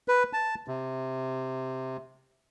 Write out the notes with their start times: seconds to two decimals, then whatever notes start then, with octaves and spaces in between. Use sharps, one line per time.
0.08 B4
0.33 A5
0.68 C3